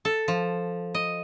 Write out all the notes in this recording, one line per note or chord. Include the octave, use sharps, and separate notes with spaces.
A4
F3
D#5